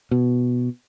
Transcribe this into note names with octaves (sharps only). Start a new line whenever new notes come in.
B2